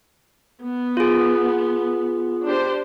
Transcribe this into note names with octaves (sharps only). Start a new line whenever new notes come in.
B3
F4 G#4
D4 G4 C5